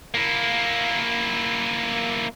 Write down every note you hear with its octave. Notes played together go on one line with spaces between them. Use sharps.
A#3 E4